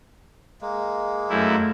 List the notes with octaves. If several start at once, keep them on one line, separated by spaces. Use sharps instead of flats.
G#3 A#3
F#2 A3 E4